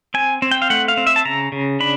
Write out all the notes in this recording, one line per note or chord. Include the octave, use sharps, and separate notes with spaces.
C4 G#5
C4
G5
F5
A3 F#5
F5
C4
E5
A5
C#3 A#5
C#3
D4 B5